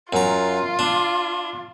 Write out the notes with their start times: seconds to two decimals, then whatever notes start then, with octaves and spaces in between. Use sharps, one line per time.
0.13 F#2 F4 A#5
0.79 D4